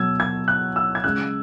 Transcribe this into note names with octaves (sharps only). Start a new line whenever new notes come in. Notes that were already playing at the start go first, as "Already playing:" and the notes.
Already playing: B2 F#3 E6 G#6
G#6
F#6
E6
G#6
C#3 G#3 F#6